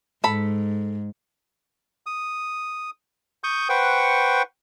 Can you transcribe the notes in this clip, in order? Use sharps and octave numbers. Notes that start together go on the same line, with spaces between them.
G#2 A4 B5
D#6
C#6 D#6 G6
B4 C5 F#5 G5 C#6